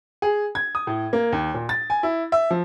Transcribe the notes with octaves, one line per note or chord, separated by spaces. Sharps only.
G#4
G#6
D#6
A2
A#3
D#2
A#2
A6
G#5
E4
E5
F3